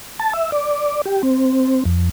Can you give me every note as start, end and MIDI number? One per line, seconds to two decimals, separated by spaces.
0.19 0.33 81
0.33 0.51 76
0.52 1.02 74
1.06 1.22 67
1.23 1.84 60
1.85 2.09 41